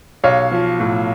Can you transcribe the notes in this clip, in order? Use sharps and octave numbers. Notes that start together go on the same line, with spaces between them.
B1 C#5 F5
F3
A2